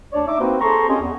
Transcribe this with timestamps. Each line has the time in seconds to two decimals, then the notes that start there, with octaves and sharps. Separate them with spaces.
0.12 D2 D4 C#5 D5
0.27 D#4 E5 D6
0.39 A#3 C4 D#4 F#4 B4 C5
0.60 G#4 A4 C5 A#5 C6 C#6
0.87 C4 C#4 F4 G4 G#4 D#5
1.01 E2